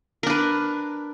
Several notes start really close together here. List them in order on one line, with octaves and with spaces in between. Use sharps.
A#4 D4 B4